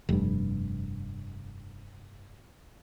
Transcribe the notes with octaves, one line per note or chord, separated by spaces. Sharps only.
F1 G2